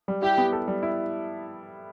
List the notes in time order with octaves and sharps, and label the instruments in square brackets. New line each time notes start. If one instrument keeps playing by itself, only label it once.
[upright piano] G3
[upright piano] E4 [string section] G4
[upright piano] B3
A4
G3
E4